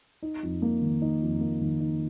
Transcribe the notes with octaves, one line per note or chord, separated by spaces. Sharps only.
D#4
F2
A#3
D#3
D#4
F2
A#3
D#3
D#4